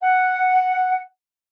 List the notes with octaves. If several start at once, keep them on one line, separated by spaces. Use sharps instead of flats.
F#5